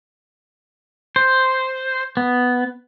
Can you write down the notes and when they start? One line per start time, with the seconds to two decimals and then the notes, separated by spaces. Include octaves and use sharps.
1.16 C5
2.17 B3